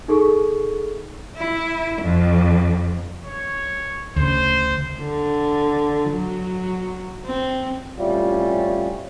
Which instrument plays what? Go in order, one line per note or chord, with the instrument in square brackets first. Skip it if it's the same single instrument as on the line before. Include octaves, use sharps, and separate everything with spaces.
[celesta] D#4 G#4 A4 C#6
[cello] E4
F2
[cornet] C#5
[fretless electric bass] D2 C#3 [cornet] C5
[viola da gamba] D3
F#3
C4
[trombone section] A2 G3 C4 C#4 E4 F4